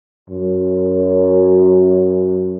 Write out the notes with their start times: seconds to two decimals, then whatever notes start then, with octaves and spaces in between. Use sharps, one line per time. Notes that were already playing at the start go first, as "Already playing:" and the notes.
0.30 F#2